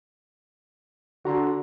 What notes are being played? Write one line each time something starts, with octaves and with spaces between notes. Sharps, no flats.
D3 F#4 A#5 C6